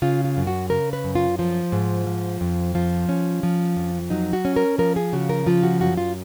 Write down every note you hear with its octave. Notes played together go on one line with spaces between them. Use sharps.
C#3 F4
F4
F#2
F#4
C#3 A#4
B4
F#2
F4
F3 F4
G#2
F3
F2
F3 F4
C#4
F3
F2
F#3 D#4
F#4
C#4
A#4
F3 A#4
G#4
C#3 F#4
A#4
F3 F4
F#4
F#2 F#4
F4